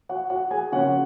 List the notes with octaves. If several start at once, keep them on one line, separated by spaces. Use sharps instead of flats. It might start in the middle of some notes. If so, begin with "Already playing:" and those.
F#4 F#5
F#4 F#5
G#4 G#5
C#3 F3 A#3 C#4 F#4 F#5